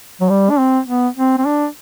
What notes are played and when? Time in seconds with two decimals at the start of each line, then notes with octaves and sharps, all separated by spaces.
0.21 F#3
0.30 G3
0.50 D4
0.59 C4
0.88 B3
1.17 C4
1.39 C4
1.47 D4